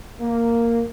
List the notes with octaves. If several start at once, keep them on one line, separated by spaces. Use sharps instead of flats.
A#3